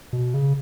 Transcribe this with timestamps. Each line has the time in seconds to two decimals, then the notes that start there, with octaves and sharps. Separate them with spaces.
0.13 B2
0.34 C#3